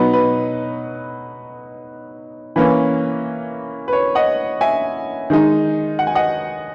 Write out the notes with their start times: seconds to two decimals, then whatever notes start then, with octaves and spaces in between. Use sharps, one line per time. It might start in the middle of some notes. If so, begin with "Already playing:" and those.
Already playing: B2 F#3 B3 D#4 B4
0.13 B4
2.56 E3 A#3 C#4 B4
3.88 B4
3.93 C#5
4.15 D#5 F#5
4.61 E5 G#5
5.30 D#3 G#3 D#4
5.99 F#5
6.07 G#5
6.15 D#5 F#5